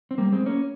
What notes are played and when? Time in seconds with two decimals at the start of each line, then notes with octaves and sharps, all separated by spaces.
0.11 C4
0.18 G3 A#3
0.32 G#3 C4
0.46 A#3 C#4